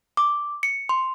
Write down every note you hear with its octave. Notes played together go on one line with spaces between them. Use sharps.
D6
C#7
C6